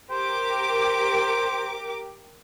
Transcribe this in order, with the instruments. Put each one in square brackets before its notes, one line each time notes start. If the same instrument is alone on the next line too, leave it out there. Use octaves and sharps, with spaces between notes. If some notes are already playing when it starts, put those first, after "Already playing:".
[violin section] G4 A#4 D6 [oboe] C5